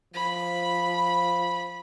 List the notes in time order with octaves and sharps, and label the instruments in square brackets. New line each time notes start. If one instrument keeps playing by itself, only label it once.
[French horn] F3 [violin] B5